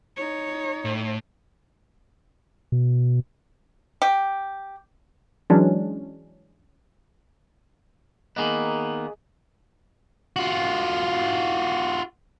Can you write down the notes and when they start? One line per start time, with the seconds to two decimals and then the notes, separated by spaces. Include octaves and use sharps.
0.16 D#4 C#5
0.85 A2
2.72 B2
4.02 G4
5.50 E3 F#3 G#3 C#4 D4
8.36 D#3 A#3 B3 G#4 D#5
10.36 F4 F#4